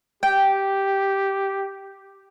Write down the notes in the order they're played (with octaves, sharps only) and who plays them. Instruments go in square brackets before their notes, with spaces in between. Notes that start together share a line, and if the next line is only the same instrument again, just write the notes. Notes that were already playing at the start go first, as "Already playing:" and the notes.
[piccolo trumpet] G4 [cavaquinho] G5